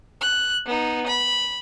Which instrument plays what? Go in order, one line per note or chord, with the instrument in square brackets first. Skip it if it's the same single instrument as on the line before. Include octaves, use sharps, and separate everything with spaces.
[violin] F#6
B3 D#4
B5